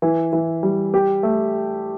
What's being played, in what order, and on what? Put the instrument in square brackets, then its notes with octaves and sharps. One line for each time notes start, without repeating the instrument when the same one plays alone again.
[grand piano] E3
E3
G3
G4
A3